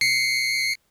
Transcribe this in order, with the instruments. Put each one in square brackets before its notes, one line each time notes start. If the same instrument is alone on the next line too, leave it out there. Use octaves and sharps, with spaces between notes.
[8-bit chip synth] C7 C#7